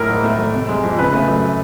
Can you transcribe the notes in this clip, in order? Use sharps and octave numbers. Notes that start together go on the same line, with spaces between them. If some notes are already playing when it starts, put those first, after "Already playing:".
Already playing: A2 A#4
G#2
A3
G#1
C3
G#3
F2
C#3 B4
A3
F#2